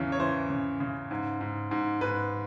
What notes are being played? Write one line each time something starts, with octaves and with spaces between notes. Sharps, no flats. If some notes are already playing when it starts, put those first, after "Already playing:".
Already playing: E2 C#3 E3
C#5
E3 C5
C#3
C#3
G#2
G#2
G#2
G#2 B4